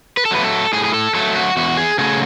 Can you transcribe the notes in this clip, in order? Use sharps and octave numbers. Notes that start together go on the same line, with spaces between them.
B4
A4
F#3 A3 B4
A4
A2 G#4
G#4
A4
F#3 A3 A4
F#4
E2 F#4
G#4
C#3 F#3 A3 G#4